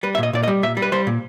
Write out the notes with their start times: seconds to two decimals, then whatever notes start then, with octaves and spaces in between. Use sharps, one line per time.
0.03 G3 B4
0.15 E5
0.18 A#2 D#5
0.33 A#2 D5
0.43 D#5
0.48 G3
0.63 A#2 E5
0.77 G3
0.82 B4
0.92 G3 C5
1.07 A#2